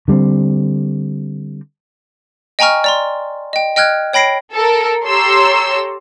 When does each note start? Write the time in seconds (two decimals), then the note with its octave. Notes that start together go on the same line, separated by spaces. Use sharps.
0.08 D3 G3 A#3 C4
2.59 D#5 G5 G#5 A#5 C#6 F6
2.84 D5 A#5 C6
3.53 D#5 G5
3.76 D#5 G5 F6 F#6 G#6
4.13 C#5 G5 B5 A#6 C7 D7
4.53 A4 A#4
5.05 G4 A4 C#5 A#5 C6 E6